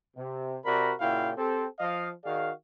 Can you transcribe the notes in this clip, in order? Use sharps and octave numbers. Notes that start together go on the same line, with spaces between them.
C3
C3 F#4 A#4 D5 B5
A#2 C#3 E4 F#4 F5 G5
C4 G4 A4
F3 D#5 F5
D#3 F#4 G#4 D5 F5